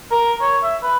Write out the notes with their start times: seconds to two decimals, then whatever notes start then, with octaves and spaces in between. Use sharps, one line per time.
0.11 A#4
0.42 C#5
0.63 E5
0.83 B4